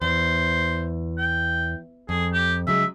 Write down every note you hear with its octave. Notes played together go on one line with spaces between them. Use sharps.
E2 C5
G5
F2 G#4
G4
C#3 F#3 G#3 E5